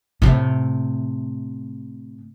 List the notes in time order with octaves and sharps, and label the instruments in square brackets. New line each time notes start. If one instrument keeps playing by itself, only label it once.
[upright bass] A2 C3